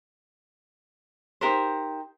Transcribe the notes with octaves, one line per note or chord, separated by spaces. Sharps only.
D#4 G4 A#4 C5